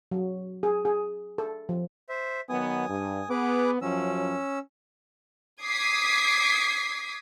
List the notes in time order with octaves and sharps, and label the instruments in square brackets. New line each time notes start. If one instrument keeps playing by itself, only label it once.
[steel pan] F#3
G#4
G#4
A4
F3
[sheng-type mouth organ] C5 E5
[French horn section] D#3 F#3 B3 [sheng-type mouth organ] G#5 D#6
[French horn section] G2
[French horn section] B3 [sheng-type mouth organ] G#4 B4 D6
[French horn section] F#2 F3 F#3 [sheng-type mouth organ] C#4 E6
[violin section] D6 D#6 G#6 B6 C7